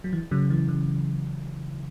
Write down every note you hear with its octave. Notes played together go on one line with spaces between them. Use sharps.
F#3
E3
C#3 F#3
E3
C#3